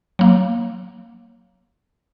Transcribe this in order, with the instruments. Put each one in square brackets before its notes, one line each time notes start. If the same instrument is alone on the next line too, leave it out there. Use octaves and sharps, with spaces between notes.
[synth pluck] F#3 A#3